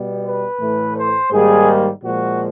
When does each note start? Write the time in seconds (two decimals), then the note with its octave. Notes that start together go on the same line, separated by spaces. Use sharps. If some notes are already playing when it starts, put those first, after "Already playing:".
Already playing: B2 G3 B3
0.24 B4
0.60 A2 E3 A3
0.96 C5
1.32 G#2 D#3 G3 A#3 G#4
2.03 A#2 F3 G#3 F#4